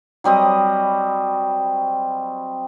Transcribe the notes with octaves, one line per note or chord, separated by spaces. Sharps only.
F#3 G3 C4 D#5